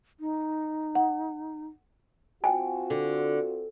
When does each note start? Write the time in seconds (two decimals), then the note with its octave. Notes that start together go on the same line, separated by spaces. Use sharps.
0.20 D#4
0.95 F#5
2.44 C4 F4 F#4 G5 G#5
2.90 D3